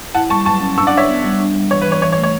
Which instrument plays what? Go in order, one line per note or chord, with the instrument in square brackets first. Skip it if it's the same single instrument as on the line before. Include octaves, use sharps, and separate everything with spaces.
[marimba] E4 [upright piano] F#5 A5
[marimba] G3 [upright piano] A5 C#6
[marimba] F#3 [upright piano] A5 C#6
[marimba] C#4
[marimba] D4 [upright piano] C#6 E6
[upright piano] D5 F#5
[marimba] D4 [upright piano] C#5 E5
[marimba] B3
G3
D4
G3
[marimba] E3 [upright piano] C#5
[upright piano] B4
[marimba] E3
[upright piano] C#5
[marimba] E3 [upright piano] C#5
[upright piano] C#5
[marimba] A3
[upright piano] C#5